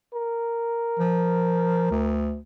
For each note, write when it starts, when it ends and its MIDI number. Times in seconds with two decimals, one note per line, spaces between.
0.14 2.20 70
0.99 1.86 53
1.91 2.38 38